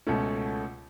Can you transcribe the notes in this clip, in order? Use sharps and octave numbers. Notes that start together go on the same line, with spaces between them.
C#2 B2 A3 C#4